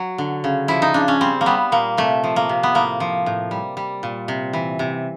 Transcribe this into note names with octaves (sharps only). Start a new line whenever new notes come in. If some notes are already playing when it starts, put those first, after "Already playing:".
Already playing: F#3
D3
C#3
F3 E4
D#4
C#3 D4
C#4
G3 C4
A#3
G3 B3
A#2 A#3
C3 A3
F3
A#3
C3
B3
A2 A#3
F3
A2
G3
G3
A#2
C3
E3
C3